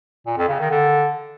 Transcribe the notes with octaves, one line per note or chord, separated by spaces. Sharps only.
A#2
F2
C#3
D#3
D3